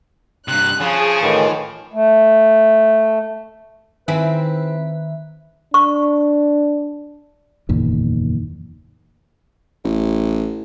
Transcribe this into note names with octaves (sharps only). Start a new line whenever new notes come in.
G2 C3 F#6
C#3 F3 G#4
A2 D#3 E3
A3
D#3 C4 E4 G#4 B4 E5
D4 C#6
F#1 E2 A#2 D#3
A1